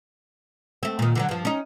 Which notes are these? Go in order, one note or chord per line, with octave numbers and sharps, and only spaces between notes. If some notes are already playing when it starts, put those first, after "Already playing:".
A3 C4
A#2 D#3
D3 E3 F#3
G2 F3
C#4 D#4